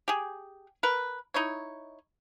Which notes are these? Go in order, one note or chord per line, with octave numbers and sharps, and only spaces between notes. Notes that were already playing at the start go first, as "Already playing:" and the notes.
G4 G#4
A#4 B4
D#4 E4 C#5